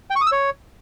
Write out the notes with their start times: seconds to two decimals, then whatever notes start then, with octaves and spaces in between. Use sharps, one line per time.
0.10 G5
0.16 C#6
0.21 D#6
0.27 E6
0.32 C#5